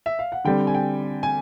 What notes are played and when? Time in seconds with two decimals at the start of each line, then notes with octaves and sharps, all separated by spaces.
0.06 E5
0.19 F5
0.32 F#5
0.45 D3 G3 C4 G5
0.67 G#5
0.75 G5
1.23 G#5